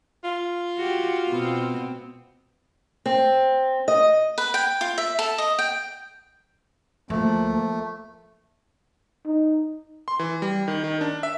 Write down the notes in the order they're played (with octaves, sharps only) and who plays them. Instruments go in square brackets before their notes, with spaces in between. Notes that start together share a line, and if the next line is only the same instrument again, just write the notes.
[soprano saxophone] F4
[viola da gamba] F#4 G4
B2 B3 C4
[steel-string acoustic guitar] C4
D#5
[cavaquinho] B4
G5
F4
E5
A4
D#5
G5
[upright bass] D2 [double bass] F3 A#3 [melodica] A3
[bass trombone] D#4
[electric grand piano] C6
E3
G3
D#3
D#3
D4
E5